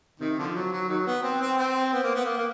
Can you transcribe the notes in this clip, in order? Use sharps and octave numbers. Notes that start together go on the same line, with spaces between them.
C3 D#3
D3 F3
F#3
F#3
D#3 F#3
B3
C4
C4
C4
B3
A#3
B3
A#3
A#3